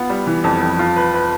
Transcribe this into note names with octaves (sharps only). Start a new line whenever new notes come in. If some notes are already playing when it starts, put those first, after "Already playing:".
Already playing: B3 F4
G3
E3
F2
F2
F4
B4
B4